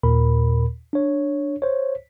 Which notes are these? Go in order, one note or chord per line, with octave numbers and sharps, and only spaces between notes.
D#2 A#2 A#4 B5
D4 C#5
C5 C#5